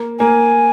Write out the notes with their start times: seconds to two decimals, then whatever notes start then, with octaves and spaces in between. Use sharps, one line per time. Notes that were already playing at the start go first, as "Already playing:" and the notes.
Already playing: A#3
0.19 A#3 G#5